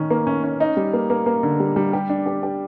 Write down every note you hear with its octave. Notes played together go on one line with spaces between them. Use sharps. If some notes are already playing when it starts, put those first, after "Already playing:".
Already playing: D#3 C#4
A#3
C#4
C#4
D#4
G3
A#3
A#3
A#3
D3
G3
G3
G4
D4
G4
G4